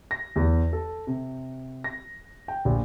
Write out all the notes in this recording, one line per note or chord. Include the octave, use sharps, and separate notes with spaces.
A#6
E2
A4
C3
A#6
G5
A#1